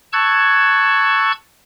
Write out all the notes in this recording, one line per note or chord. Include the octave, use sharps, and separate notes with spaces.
A5 C#6 E6 F#6 G#6